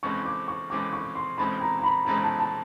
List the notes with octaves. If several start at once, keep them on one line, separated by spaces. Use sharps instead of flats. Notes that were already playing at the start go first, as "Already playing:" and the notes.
F2 C#3 E3 G#3 C4 C#6
D6
C#6
F2 C#3 E3 G#3 C4 D6
C#6
C6
F2 C#3 E3 G#3 C4 B5
A#5
A#5
B5
F2 C#3 E3 G#3 C4 A#5
A5
A5